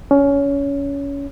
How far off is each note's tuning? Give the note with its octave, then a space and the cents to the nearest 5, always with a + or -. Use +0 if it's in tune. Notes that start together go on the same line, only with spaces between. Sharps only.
C#4 +20